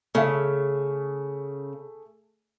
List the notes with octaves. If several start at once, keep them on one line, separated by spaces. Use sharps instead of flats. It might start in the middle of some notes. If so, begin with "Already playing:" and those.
C#3 A3 G#4 E5